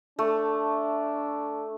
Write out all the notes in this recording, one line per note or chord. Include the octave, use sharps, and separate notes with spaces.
A3 D4